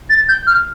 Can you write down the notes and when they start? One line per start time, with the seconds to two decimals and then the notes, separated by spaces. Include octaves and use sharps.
0.10 A6
0.29 G6
0.47 F6